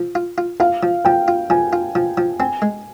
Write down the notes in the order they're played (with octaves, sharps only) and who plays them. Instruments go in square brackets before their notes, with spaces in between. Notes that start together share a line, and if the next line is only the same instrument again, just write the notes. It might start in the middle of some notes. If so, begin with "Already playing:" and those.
Already playing: [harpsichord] F3
F4
F4
[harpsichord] F4 [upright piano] F5
[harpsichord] F3
[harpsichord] F3 [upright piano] G5
[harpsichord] F4
[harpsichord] F3 [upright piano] G#5
[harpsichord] F4
F3
F3
[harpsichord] C4 [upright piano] G#5
[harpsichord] G#3